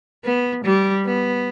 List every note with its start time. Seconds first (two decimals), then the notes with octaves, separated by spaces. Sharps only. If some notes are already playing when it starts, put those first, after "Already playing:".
0.24 B3
0.65 G3
1.06 B3